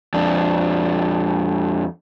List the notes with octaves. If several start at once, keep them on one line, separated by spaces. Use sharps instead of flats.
F2 D4